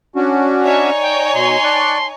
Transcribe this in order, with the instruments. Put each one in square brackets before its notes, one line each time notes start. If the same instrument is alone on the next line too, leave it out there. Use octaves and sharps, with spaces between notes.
[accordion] C#4 D4 F#4
[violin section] D#4 C#5 G#5 [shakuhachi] D5 [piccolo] E5
[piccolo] G5
[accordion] B2 [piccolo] C6
[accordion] D5 C#6 F#6 [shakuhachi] A5